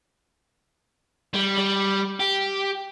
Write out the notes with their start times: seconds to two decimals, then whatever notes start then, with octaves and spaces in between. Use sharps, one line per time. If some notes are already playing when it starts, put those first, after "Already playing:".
1.34 G3
1.58 G3
2.20 G4